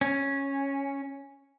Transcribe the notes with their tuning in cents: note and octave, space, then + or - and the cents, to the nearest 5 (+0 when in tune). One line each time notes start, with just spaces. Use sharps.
C#4 -5